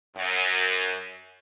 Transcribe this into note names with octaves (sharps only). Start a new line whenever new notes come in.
F#2